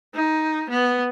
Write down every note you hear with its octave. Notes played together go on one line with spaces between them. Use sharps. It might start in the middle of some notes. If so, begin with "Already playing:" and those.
D#4
B3